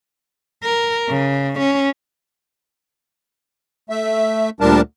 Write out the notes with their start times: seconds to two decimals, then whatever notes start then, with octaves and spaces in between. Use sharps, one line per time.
0.64 A#4
1.09 C#3
1.59 C#4
3.90 A3 E5
4.60 D2 A#2 G3 D4 A#4 A5